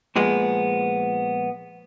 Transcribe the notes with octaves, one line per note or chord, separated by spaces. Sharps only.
A#2 F3 G#3 B3